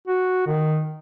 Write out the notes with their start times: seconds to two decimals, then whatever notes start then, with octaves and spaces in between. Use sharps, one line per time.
0.08 F#4
0.47 D#3